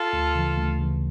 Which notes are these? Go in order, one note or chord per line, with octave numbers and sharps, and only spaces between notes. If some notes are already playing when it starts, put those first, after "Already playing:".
Already playing: F4 A4
D2
C#3 E3
D2
C#3 E3